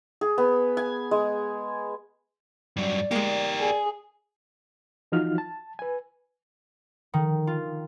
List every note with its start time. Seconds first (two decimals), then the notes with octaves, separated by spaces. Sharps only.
0.21 G#4
0.38 B3
0.77 G#5
1.11 G#3
2.77 G2 F#3 D5
3.11 G#3 A#3 G4 A#4
3.60 G#4
5.12 E3 F3 D#4 F4 F#4 F6
5.38 A5
5.79 B4 G#5
7.14 D#3
7.47 F4